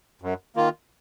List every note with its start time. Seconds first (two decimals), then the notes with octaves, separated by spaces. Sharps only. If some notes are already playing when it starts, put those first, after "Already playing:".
0.22 F#2
0.56 D#3 A#3 F4